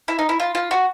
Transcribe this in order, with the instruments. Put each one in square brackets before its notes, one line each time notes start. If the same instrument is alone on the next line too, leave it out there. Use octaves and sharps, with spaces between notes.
[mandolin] E4
D#4
E4
F4
F4
F#4